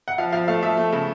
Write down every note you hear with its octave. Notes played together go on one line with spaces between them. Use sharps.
F#5
F3 F5
F3 F5
A3 F5
F3 E5
A3
C#3